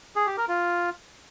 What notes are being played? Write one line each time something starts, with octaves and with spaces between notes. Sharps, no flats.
G#4
G4
A#4
F4